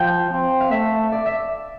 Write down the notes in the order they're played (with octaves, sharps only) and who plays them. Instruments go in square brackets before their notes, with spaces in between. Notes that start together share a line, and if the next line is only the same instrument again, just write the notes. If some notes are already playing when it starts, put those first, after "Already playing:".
Already playing: [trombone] F3 [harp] F5 G5
[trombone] C4
[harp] F5
[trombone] A3 [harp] E5
[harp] D5
E5